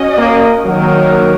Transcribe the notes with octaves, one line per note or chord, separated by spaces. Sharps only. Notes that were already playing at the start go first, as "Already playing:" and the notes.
Already playing: C#4 F#4 D#5
A#3
D#3 F#3 A#3 D#4 A#4